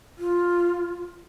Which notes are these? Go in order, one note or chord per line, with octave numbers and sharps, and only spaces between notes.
F4